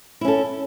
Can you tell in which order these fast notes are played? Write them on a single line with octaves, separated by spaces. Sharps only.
E4 C#4 A4